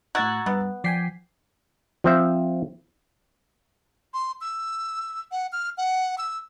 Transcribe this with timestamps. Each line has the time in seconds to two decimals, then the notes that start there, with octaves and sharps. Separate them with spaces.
0.15 A2 F#4 A#5 E6 F#6 G#6 A6
0.46 G2 B3
0.84 F3 D5 G5 G#5 B6 C7
2.04 F3 C4 E5
4.14 C6
4.41 E6
5.32 F#5
5.52 F6
5.78 F#5
6.18 E6